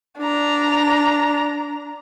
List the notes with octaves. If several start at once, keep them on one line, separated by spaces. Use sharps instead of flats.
D4 A#5